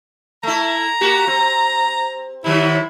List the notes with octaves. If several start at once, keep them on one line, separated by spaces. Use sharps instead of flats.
A3 E4 A#5
A#3 F#4 G4
C4
C3 D#3 F#3 E4